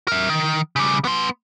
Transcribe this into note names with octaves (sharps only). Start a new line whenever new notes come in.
A#4 E5
D#3
C#3 G3
B3 C6